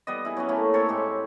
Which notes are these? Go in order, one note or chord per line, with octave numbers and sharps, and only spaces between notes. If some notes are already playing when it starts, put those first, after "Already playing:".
G3 B3 D#5
E4 G#4
F#3 B3 C#4
A3 A#3 C#4 E4
C4 A4 A#4 C#5
A2 G#3 G4